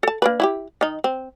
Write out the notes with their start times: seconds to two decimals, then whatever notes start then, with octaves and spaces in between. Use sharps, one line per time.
0.03 A4 A5
0.22 A#3 D4 B4
0.40 E4 F#4 G4
0.81 D#3 D#4
1.04 C4